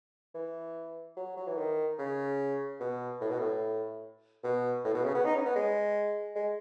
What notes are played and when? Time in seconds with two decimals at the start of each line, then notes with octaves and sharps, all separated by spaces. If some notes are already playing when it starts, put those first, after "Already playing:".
0.34 E3
1.16 F#3
1.36 F#3
1.47 E3
1.57 D#3
1.98 C#3
2.80 B2
3.21 A2
3.29 B2
3.38 A2
4.43 B2
4.84 A2
4.94 B2
5.05 C#3
5.15 B3
5.25 D#4
5.35 C#4
5.45 B3
5.55 G#3
6.35 G#3